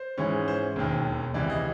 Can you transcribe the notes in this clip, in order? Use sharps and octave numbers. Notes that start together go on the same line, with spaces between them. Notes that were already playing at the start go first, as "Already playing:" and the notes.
Already playing: C5
G#2 E3 G#3 C#4
C5
E1 D#2 D#3
C#2 C3 E3 D5
D#5